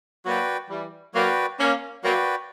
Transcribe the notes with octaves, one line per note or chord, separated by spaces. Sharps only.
F#3 A#3 F#4 B4 D5 G5
E3 G3
F#3 A#3 F#4 B4 D5 G5
A#3 C#4
F#3 A#3 F#4 B4 D5 G5